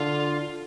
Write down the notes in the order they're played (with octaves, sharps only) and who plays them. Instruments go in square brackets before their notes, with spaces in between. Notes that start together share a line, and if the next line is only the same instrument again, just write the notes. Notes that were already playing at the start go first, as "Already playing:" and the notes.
Already playing: [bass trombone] D3 [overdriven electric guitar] F4